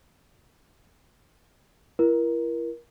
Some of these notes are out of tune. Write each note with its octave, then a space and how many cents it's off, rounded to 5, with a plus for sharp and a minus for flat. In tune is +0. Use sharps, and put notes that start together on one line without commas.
E4 +35 A#4 +25